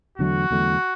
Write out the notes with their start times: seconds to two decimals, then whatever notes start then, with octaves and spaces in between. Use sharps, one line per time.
0.18 E2 D3 F#3 A3 F#4
0.51 E2 D3 F#3 A3